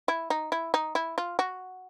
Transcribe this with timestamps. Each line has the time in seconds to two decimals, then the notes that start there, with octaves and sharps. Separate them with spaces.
0.08 E4
0.30 D#4
0.52 E4
0.74 D#4
0.95 E4
1.18 F4
1.39 F#4